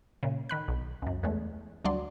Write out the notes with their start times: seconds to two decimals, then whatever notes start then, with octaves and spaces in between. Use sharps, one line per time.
0.23 A#2 C#3
0.49 D#3 B5 F#6
0.68 B1
1.02 C#2 F#2
1.23 E2 G#3 A3
1.84 D2 F#3 G3 D5 C6